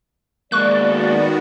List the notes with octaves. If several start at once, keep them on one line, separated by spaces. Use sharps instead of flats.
D#3 G#3 A#3 B3 F#4 D5 C#6 F#6